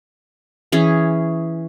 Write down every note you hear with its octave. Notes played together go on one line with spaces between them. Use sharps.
E3 C#4 G#4